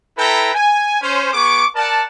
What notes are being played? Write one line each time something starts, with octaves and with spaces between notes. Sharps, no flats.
E4 A4 B4 G5 A#5
G#5
C#4 C5
B3 G#4 C#6 D6
A#4 D5 F#5 A5